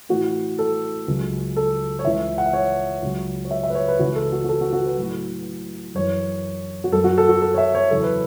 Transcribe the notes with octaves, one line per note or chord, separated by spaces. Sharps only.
A2 E3 F#4
A4
C#2 C#3 F#3
A4
C#5
C#2 C#3 E3 E5
F#5
E5
C#5
C#2 C#3 F#3
C#5
E5
E5
B4
C#5
B4
C#2 C#3 E3 F#4
A4
F#4
F#4
A4
F#4
F#4
B4
A2 F#3
F#2 E3 C#5
F#4
F#2 F#3 A4
F#4
A4
F#4
A4
C#5
E5
C#5
E2 C#3 F#3 A4
B4